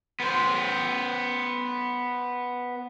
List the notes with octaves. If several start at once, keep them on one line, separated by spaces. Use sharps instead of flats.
B3 C5